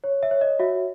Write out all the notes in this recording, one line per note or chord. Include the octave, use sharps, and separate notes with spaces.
C#5
E5
C#5
D#5
F#4 E5